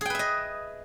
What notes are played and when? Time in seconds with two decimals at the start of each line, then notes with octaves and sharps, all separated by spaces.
0.01 G#4
0.05 G5
0.10 B4
0.15 E5
0.19 D#5